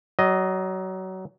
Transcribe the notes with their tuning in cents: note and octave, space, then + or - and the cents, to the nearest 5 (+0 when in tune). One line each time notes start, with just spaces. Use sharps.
F#3 +25 D#5 +0